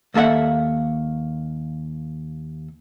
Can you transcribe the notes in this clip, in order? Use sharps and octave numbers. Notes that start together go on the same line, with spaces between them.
D#2 A#3 A4 E5 F#5